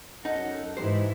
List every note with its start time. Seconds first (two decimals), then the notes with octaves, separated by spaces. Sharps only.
0.25 F#2 D#4 A4 F#5
0.77 G#2 E3 D#4 E4 G4 C5